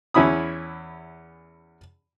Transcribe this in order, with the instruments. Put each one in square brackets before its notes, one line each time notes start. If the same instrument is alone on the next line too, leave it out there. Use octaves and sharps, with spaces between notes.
[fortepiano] E2 C#4 E4 B5 D#6